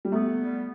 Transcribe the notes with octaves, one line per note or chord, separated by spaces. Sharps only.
G3
A3 B3
G3